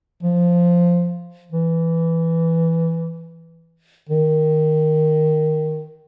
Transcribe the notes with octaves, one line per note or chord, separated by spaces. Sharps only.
F3
E3
D#3